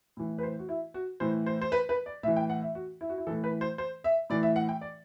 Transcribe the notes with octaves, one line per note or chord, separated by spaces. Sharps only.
A2 E3
B4
C5
F#4
E4
F#4
A2 E3 C5
C5
C5
B4
B4
D5
A2 E3 E5
G5
F#5
E5
F#4
E4
F#4
E4
A2 E3 A4
B4
C5
C5
E5
A2 E3 D5
E5
F#5
G5
D5